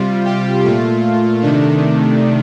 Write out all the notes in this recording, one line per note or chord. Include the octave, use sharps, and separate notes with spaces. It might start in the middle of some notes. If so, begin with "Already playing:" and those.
Already playing: C3 G3 F4
G4
A#2 A3 F4
C3 D#3 A3 D4